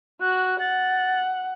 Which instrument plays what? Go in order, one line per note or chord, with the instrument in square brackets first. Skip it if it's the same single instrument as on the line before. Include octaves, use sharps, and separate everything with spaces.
[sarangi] F#4 [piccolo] F#6
[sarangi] F#5 [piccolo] A6